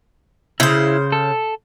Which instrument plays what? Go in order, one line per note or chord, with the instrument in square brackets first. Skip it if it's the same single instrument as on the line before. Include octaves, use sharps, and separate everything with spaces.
[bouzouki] C#3 C5 [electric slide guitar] E4
[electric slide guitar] A4